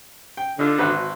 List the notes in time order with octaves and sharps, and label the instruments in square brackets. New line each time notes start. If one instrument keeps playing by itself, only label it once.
[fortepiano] G5
[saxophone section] D3 [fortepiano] D#4 F4
[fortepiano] G#1 F#4 B4